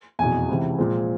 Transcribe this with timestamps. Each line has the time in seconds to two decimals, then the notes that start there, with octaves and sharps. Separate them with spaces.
0.19 F1 E2 B2 G#5
0.49 C#2 C3 E3
0.78 A#2 F3 G#3 C4